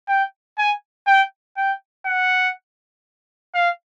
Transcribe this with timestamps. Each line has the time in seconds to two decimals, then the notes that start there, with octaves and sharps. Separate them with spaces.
0.08 G5
0.58 G#5
1.07 G5
1.57 G5
2.06 F#5
3.55 F5